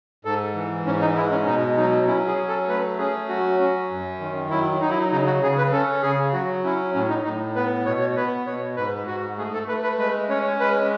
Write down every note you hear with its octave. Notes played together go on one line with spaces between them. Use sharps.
G#2 A4
E3
G#2 C#4
D#4
G#3 E4
C#4
B2 D#4
F#3 D#4
C#4 E4
G#4
F#3
A4
A3 B4
C#4 G#4
F#3 F#4
C#4
F#2
D#3
F#3 E4
F#3 D#4
E4
D#4
C#3 D#4
F#4
C#3 G#4
B4
C#4 A4
C#3 G#4
F#3 F#4
C#4 E4
A2 C#4
D#4
A2 D#4
B3 B4
B2 C#5
C#5
B3 B4
B2 C#5
G#2 B4
G#2 F#4
A3 G#4
A4
A3 B4
B4
G#3 B4
C#4 C#5
G#3 B4